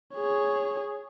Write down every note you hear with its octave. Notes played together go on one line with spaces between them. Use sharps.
G#4 C#5